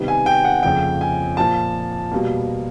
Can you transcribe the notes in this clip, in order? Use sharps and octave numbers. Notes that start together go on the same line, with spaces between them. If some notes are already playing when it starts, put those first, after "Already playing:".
Already playing: C3 D#3 G3 B3
G#5
G5
F#5
F2 C#3 F3 A#3 G5
G#5
A#2 F3 A#3 A5
B2 G3 A#3